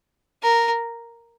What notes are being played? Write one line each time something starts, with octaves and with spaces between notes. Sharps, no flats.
A#4